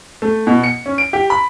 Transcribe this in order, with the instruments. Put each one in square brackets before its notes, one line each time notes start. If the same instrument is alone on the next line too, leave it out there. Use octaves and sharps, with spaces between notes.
[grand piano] A3
B2
C#7
C#4
D7
G4
B5